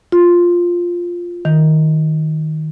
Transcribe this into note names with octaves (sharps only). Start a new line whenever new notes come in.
F4
D#3